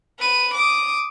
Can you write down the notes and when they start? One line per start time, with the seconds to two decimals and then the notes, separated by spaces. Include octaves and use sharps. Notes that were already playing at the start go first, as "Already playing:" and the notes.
0.19 B4 D#7
0.54 D6 D#6